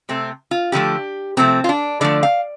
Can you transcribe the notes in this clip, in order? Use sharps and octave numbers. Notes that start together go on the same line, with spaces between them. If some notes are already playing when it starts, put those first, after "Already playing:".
C3 A3 C4
F4
D3 F3 A3 G4
C3 F3 A3 C4
F4
D4
D3 F3 A3 D5
F5